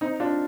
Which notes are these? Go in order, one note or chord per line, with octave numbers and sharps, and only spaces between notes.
C4 D#4
D4 F4